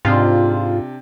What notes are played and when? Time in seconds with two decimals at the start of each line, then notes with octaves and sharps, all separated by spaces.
0.05 G#2 C3 D4 F4